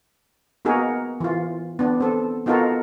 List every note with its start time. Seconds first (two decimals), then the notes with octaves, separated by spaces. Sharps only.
0.65 A#3 B3 D#4 F#4 G#4 A#4
1.20 E3 F4
1.79 B3 D4
2.00 C4 A4
2.46 B3 D#4 F4 F#4 A4 A#4